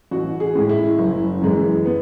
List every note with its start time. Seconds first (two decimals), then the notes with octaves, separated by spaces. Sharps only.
0.11 A1 F#4
0.40 G#4
0.55 A2 G#3
0.69 E4
0.99 F#1
1.42 F#2 E3 G#3
1.86 B3